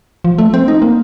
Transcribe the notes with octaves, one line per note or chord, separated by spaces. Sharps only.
F3
A3
C4
D#4
A#3